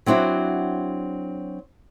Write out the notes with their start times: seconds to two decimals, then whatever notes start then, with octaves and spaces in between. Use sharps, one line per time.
0.06 F#3 C4 D4 E4 F#4